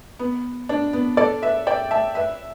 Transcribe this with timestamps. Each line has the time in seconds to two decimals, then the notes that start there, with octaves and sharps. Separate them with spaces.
0.19 B3
0.69 D4
0.93 B3
1.17 A4 D5
1.43 B4 E5
1.67 D5 G5
1.91 E5 A5
2.15 B4 E5